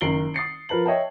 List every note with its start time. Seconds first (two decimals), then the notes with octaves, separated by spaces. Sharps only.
0.01 F#1 D#3 C7 D7 F#7 G7
0.34 D#6 A6 C7 C#7
0.69 F3 A#4 B4 A5 F#7
0.86 C#5 D#5 E5 G5 A5